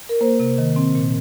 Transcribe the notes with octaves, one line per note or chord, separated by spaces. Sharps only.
A#4
A#3 C5
C3
D#3
C4
A#2